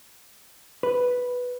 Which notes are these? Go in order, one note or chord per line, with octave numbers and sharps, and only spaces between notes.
B4